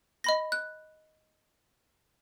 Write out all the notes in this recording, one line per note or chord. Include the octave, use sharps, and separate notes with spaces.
D#5 B5 A#6
F#6